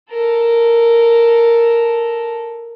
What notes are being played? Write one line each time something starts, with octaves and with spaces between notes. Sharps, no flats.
A4 A#4